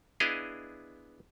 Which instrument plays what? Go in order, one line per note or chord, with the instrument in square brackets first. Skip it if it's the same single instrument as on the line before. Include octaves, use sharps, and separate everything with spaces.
[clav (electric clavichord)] B3 D4 E4 G#4 D#5 F5